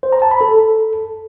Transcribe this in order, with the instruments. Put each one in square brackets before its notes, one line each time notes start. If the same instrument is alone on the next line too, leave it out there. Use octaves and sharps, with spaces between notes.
[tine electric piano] C5
A#5
A5
B5
A4